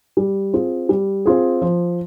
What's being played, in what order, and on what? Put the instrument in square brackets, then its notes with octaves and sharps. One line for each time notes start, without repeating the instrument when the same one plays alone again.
[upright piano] G3
C4 F4 G#4
G3
C4 F4 G#4
F3